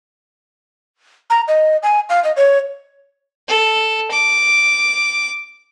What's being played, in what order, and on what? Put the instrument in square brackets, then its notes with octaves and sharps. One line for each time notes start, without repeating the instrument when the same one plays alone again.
[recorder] A#5
D#5
G#5
F5
D#5
C#5
[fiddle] A4
D6